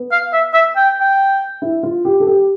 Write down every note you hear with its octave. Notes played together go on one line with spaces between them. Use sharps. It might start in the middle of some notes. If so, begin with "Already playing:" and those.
Already playing: B3
F5
E5
E5
G5
G5
E4
F4
G4
A4
G4